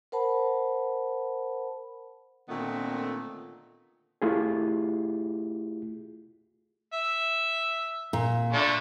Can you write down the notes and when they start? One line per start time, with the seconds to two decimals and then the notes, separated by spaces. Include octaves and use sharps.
0.12 A#4 C5 F#5 A5 B5
2.49 A#2 D3 D#3 A3 B3 C4
4.22 A3 E4 F4 G4 G#4
6.93 E5
8.13 A#2
8.53 D3 A3 D4